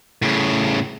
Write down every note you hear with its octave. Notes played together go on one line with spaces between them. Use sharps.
A2 C#3